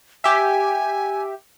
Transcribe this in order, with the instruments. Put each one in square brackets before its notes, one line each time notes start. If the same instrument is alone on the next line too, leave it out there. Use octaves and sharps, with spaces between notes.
[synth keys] G4 E5 [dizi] G#5